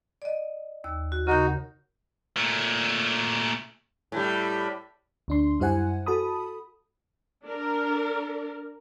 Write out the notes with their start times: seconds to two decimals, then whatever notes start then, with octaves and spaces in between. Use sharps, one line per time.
0.22 D5 D#5
0.84 D#2 E6
1.12 F#4
1.27 C#3 D#4 F#4 A#4 G6
2.37 A#2 A3
4.12 A2 G3
5.28 D2 D4 C6
5.60 F#2 G3 E4 C5 F#5 G#5
6.06 F#4 A4 A5 B5 D#6
7.45 D4 A#4